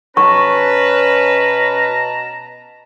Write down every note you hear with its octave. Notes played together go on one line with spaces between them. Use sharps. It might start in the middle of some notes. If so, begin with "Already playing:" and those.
B2 C#4 B4 A5 A#5 C#6